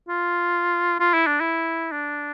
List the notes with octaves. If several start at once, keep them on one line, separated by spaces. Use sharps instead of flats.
F4
F4
E4
D4
E4
D4